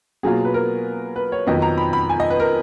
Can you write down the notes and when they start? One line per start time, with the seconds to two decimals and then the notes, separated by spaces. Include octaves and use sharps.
0.23 B2 F#3 A#3 F4 G#4
0.45 B4
0.54 A#4
1.16 B4
1.32 C#5
1.47 F2 D#3 F#3 B3 D#5
1.62 A#5
1.78 B5
1.93 B5
2.09 G#5
2.20 D#5
2.30 B4
2.40 A#4